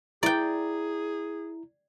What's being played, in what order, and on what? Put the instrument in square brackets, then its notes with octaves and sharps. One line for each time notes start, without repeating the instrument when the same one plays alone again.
[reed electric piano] E4 A#5 [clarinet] G#4 [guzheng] D5 G5